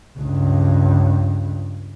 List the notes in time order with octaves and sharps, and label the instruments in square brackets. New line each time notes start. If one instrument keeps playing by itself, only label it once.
[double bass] C#2 G2